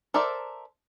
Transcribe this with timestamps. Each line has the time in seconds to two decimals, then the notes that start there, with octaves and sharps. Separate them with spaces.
0.14 A4 A#4 C5 D5 E5